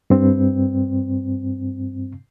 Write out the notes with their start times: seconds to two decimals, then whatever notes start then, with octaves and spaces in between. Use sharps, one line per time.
0.10 G2 C4